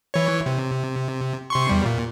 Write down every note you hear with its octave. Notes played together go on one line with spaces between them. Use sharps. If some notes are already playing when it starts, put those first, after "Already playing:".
E3 C#5
C3
C3 C6 C#6
E2 G3
A#2